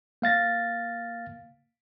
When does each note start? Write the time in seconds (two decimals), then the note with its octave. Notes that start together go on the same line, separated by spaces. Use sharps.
0.22 A#3 F5 A6 A#6